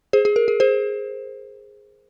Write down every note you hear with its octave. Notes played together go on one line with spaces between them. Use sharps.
G#4 C5
G#4
A#4
G#4
G#4 C5